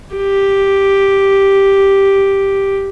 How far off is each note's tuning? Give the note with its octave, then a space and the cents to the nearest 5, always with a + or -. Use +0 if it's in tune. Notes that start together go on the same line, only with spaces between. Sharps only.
G4 +0